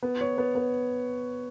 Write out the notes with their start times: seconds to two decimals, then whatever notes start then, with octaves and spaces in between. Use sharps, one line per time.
0.03 B3
0.21 C#5
0.38 B3
0.55 B3